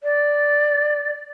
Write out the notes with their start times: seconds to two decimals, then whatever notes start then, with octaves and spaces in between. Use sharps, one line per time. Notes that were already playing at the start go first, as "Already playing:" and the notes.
0.03 D5